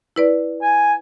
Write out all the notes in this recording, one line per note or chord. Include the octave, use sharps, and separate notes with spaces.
E4 B4 D5
G#5